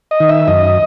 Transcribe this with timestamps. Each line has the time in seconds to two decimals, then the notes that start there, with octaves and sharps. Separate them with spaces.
0.11 D#5
0.20 D#3
0.29 E5
0.47 F#2 D#5